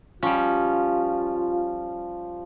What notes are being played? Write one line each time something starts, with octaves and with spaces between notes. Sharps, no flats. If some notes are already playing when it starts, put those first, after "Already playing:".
F3 G3 C#4 F4